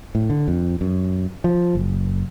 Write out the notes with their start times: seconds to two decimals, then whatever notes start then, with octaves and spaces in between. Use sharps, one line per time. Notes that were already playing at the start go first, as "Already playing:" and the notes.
0.15 A2
0.30 D3
0.48 F2
0.81 F#2
1.44 F3
1.75 F#1